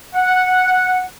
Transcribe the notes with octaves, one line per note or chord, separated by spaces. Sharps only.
F#5